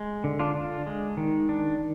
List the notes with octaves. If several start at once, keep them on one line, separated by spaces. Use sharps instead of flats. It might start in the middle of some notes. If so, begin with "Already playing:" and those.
Already playing: G#3
D3
D4 F4
D4
G#3
D#3
D4